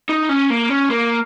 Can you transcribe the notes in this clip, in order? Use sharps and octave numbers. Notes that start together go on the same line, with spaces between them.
D#4
C#4
A#3
C#4
A#3